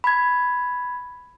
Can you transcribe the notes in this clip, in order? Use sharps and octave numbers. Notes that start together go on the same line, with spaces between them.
B5 G#6